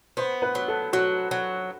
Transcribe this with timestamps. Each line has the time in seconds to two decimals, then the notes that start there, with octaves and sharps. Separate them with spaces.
0.17 B3 C5
0.42 B4
0.55 F#3
0.68 A4
0.93 F#3 F#4
1.31 F#3